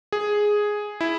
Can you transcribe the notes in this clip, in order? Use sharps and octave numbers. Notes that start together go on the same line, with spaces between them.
G#4
E4